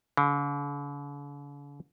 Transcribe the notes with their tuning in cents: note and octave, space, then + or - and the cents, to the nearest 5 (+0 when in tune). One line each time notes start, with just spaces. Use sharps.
D3 -45